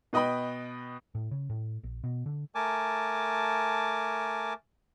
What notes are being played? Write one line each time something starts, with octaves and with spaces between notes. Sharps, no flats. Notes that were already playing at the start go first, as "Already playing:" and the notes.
B2 B4 D#5 G5 B5
A2
C#3
A2
A#1
B2
D3
A3 A#4 G#5 A5 D6